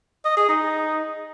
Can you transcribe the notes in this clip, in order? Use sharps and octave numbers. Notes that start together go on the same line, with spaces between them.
D#5
G#4
D#4